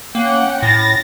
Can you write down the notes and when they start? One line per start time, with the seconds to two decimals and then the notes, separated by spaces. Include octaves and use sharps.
0.15 A#3 C#4 F#5 G5
0.63 A2 A6 A#6